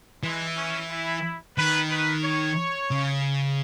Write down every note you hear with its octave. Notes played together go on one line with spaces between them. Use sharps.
E3 G#3
C#4
E4
D#3 B4
B4
C#5
C#3